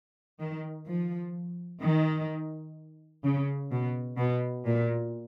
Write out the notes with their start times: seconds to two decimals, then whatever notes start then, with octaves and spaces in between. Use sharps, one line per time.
0.40 D#3
0.87 F3
1.82 D#3
3.24 C#3
3.72 B2
4.18 B2
4.66 A#2